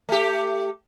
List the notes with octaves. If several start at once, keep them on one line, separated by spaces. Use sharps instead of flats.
A3 G4